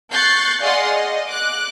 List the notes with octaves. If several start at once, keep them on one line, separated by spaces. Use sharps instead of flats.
C#6 F#6 G6 A6 C7
G#4 D5 D#5 F5 F#5 C6
D#5
D6 F#6